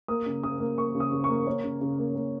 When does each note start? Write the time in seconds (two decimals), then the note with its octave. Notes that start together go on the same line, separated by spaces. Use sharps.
0.08 A#3 D#6
0.26 C#3
0.43 C#3 D#6
0.60 A#3
0.77 A#3 C#6
0.95 C#3
1.00 D#6
1.11 C#3
1.24 C#6
1.29 A#3
1.47 A#3 C#5
1.64 C#3
1.81 C#3
1.98 A#3
2.15 A#3